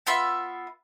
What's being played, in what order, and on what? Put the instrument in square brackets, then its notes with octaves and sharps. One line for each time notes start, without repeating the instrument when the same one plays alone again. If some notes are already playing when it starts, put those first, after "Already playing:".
[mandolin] B3 F4 E5 B5